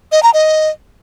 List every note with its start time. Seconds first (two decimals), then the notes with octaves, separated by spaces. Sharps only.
0.12 D#5
0.23 A#5
0.34 D#5